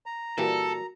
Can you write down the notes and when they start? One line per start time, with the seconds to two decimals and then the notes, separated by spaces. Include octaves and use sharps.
0.06 A#5
0.38 A#2 E3 G3 F#4 A4 A#4